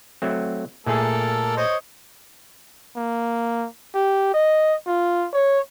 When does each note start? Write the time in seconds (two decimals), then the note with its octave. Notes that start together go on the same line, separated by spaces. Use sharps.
0.22 F#3 A3 C4
0.86 A#2 A3 A#3 G#4 A4
1.57 C5 C#5 D#5
2.96 A#3
3.95 G4
4.34 D#5
4.87 F4
5.34 C#5